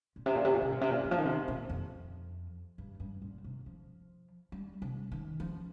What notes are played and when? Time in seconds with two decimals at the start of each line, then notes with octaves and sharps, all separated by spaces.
0.16 A#2
0.26 C3
0.35 A#2
0.45 C3
0.54 A#2
0.62 C3
0.72 A#2
0.81 C3
0.91 A#2
1.04 D#3
1.11 F3
1.18 D#3
1.25 C3
1.48 A#2
1.70 F2
2.78 G2
3.00 G2
3.22 A#2
3.44 C3
3.66 F3
4.52 G3
4.82 C3
5.12 D#3
5.40 F3